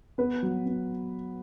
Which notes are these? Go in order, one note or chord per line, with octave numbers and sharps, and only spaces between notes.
B3 B4
F#3
B3